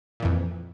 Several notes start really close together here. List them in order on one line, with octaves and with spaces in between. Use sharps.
A#2 E3 F2